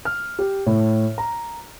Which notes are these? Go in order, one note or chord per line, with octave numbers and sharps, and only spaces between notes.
F6
G4
A2
A#5